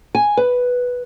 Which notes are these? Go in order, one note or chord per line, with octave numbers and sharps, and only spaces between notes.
G#5
B4